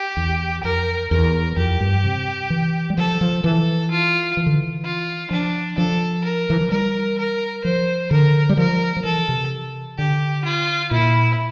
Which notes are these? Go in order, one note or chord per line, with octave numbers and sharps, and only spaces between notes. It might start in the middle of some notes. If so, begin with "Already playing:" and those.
Already playing: G4
E2
F2 A#4
E2 A#4
F2 G4
G2
C3
E3
G3
F3 A4
F3
E3 A4
F4
E3
D3
E3
F4
F3 D4
F3 A4
A#4
E3
F3
G3 A#4
A#4
F3 C5
D3 A#4
G3
F3 A#4
F3
E3 A4
C3
D3 G4
F4
A#2 E4